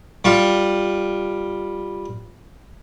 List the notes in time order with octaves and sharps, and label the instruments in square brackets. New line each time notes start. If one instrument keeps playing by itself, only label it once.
[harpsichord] G3 F4